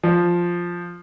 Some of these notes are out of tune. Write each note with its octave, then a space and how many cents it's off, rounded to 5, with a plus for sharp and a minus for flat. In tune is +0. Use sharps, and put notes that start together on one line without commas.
F3 +0